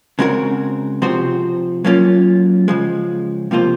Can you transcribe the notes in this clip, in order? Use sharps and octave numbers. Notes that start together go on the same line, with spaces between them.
C#3 G#3 C4 F#4 A#4
C3 F3 C4 F#4 C5
F#3 A#3 C#4 F4
C#3 F3 G#3
C3 F3 A#3 F4 C5